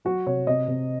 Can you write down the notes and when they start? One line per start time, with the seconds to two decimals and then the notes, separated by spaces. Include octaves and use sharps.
0.05 F#3 F#4
0.27 C3 C#5
0.47 C3 D#5
0.68 C3